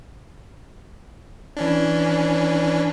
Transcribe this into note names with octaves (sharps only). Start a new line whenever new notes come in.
E3 C#4 D4